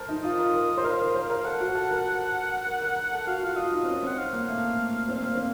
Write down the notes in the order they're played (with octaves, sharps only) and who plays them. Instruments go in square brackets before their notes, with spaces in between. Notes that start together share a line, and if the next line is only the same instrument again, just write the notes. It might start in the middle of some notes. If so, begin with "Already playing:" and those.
Already playing: [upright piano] A4 A#4 C5
D#4
[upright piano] F4 [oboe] D#5
[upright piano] A#4
A#4
C5
[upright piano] A#4 [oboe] F5
[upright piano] A#4
C5
A#4
[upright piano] A4 [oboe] F#5
[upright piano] F#4
A4
A#4
A#4
A#4
A#4
A4
[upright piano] F#4 [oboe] F5
[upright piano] F4 [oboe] F5
[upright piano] F4 [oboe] D#5
[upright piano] D#4
C4
[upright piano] C#4 [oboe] D#5
[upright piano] C4 [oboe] F#5
[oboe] F5
[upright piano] A#3
A3
C4
A#3
C4